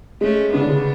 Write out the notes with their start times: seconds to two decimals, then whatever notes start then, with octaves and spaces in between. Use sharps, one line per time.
0.21 G#3 A3 C#4
0.54 C#3 B3 D4
0.61 D3
0.69 C#3